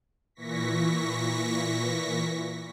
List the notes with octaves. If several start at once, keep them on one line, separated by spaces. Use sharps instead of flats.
A#2 E3 C#6 A#6 B6